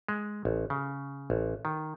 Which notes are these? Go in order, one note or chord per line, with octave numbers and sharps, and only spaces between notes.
G#3
A1
C#3
A1
D#3